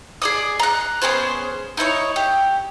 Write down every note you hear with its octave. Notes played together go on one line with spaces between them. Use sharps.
G#4 D5 D#6
A#5 F#6
B3 C#4 G#4 C5
D#4 E4 B4 C#5
G4